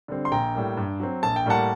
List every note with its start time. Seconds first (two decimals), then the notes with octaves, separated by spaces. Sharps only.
0.08 D3 G3 C4
0.25 C6
0.32 A#1 G5 A#5
0.54 A2 G3 A#3
0.77 G2
1.00 F#3 C4
1.23 A#1 A5
1.36 G5
1.46 A2 G3 A#3 F#5 A5